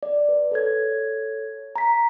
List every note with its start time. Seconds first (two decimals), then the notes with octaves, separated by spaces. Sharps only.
0.03 D5
0.29 B4
0.52 A4 C#5 G#6
1.76 A#5 B6